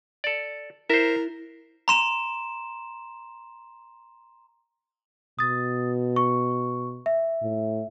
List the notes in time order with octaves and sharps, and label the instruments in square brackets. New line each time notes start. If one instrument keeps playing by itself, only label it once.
[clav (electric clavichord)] A4 D5
[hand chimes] E4 [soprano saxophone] A#4 [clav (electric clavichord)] C5 E5
[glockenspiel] A#5 C6 E7
[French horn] B2 [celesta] D#6 A6
[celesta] C#6
E5
[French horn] A2